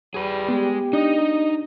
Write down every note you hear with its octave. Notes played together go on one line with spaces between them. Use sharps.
G3 G#4 B4
G#3 B3 G4
D4 D#4 D#5